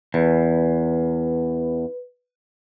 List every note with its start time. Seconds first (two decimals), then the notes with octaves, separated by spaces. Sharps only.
0.14 E2 B4